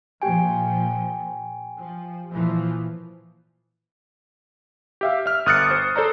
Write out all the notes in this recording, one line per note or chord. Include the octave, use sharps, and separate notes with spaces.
A#2 F3 G4 G5 G#5
F3
A#2 E3 F3
G4 E5 F5
E5 F6
G1 D#6 F#6 A6 C#7
C5
A4 C5 D5 A#5